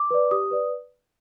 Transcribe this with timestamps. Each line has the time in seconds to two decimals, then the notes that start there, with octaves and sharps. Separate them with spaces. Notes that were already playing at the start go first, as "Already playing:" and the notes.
Already playing: D6
0.11 B4 D5
0.31 G4 D#6
0.51 B4 D5